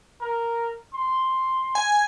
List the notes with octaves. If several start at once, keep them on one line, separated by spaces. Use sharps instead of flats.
A#4
C6
G#5